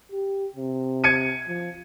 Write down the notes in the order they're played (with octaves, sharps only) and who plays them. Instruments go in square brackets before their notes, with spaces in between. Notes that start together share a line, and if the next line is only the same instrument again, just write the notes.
[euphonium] G4
C3
[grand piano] G#6 C#7 D#7
[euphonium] F3